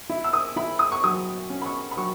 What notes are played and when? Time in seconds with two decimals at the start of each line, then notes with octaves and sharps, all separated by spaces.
0.10 E4
0.24 E6
0.33 D#6
0.56 E4 B5
0.79 D#6
0.92 C#6
1.04 F#3 D#6
1.50 C#4
1.62 B5
1.66 C#6
1.91 B5
1.97 F#3 C#6